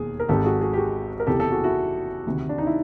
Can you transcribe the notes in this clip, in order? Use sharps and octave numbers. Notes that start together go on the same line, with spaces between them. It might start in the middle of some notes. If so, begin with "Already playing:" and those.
Already playing: E1 D#2 G#4
A#4
G#1 G#2 D#3 G4 A4
F#4 G#4
F#4 G#4
G4
F#4 G#4
A#4
F#1 E2 C3 E3 G4 A4
G4 A4
F#4 G#4
E4 F#4
D2 C3 D#3
D4
D#4
E4